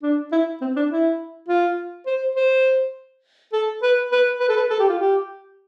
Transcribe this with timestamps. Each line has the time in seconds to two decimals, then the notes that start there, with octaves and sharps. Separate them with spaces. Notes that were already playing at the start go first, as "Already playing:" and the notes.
0.03 D4
0.32 E4
0.61 C4
0.76 D4
0.90 E4
1.48 F4
2.07 C5
2.35 C5
3.53 A4
3.82 B4
4.12 B4
4.40 B4
4.49 A4
4.56 B4
4.70 A4
4.79 G4
4.89 F4
4.99 G4